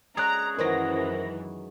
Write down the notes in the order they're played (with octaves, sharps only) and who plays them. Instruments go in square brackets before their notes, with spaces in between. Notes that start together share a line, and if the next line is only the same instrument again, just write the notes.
[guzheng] G#3 C#4 D5 [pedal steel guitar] G#4 F#6 [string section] A#5
[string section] F#2 E3 [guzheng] D#3 F#3 G#3 [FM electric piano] A#4 C5 A#6